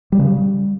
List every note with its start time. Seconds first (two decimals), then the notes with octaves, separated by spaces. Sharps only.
0.12 G3
0.19 C#3
0.26 G3